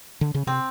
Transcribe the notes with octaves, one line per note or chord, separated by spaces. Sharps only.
D3
C#3
C3 C4